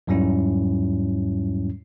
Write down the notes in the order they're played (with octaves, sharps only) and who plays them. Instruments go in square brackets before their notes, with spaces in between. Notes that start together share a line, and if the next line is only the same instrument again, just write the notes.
[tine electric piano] E2 G#2 F#3 G3 C#4 E4